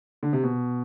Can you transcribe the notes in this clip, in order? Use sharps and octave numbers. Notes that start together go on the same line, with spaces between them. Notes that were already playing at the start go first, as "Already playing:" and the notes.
D3
C3
B2